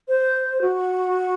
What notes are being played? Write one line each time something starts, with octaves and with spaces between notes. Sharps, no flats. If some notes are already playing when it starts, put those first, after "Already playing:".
C5
F#4